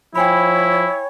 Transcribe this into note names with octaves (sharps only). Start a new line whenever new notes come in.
F3 E4 C#5 G5 G#5 B5